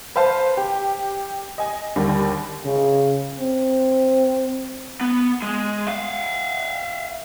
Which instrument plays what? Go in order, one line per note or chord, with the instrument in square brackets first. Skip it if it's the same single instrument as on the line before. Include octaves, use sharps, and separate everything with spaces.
[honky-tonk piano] B4 C5 F5 A5
G4
D#5 G#5
D#2 D3 G3
[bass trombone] C#3
C4
[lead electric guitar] B3
G#3
E5 F5